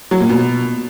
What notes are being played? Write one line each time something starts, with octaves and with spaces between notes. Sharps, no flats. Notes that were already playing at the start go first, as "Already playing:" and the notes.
F#3
A#2
B2